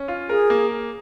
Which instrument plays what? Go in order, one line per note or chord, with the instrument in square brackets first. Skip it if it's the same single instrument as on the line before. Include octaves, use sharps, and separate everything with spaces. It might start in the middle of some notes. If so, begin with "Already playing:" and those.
Already playing: [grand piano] C#4
F4
[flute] G#4 [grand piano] A#4
[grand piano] A#3